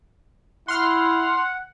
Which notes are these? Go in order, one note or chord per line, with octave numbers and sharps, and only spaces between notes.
E4 F#5 C6 F6